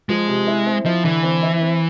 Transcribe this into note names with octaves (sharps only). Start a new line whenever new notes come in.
F3 G#3
C3
E4
C4
F3 E4
D3 E3
C4
E4
C4